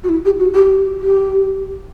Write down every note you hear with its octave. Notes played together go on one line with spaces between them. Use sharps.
F#4
E4
G4
F#4
G4
G4